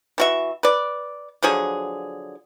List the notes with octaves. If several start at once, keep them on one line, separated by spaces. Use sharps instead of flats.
E3 F#4 E5
B4 D5
D3 F3 F#3 G#4